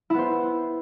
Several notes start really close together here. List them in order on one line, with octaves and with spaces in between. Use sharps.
E4 B3 C5